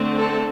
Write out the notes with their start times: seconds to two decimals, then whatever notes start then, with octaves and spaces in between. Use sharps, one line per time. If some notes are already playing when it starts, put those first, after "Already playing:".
Already playing: D3 A3 C4
0.16 A4